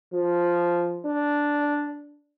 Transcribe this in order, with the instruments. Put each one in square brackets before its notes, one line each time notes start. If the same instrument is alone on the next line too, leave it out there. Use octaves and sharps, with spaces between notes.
[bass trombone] F3
D4